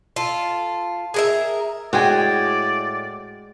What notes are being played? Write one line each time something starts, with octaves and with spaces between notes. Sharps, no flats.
F4 A4
G#4 A#4 E5
A2 G#3 F#4 D5 G5 G#5